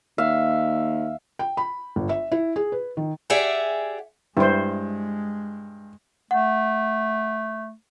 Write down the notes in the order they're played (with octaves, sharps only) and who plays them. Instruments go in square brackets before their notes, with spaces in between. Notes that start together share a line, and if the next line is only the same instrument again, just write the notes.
[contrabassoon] D#2 [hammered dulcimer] E5 [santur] F5
[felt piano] G5
B5
G1
E5
E4
G#4
B4
D#3
[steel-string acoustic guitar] G4 G#4 D5 E5 F#5 G#5
[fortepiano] G2 [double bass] G#3 [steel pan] E4 C5
[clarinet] A3 [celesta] F#5